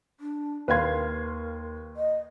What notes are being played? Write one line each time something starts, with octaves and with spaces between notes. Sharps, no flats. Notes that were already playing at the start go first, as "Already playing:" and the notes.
D4
D#2 A#4 B4 F5 C6 G#6
D#5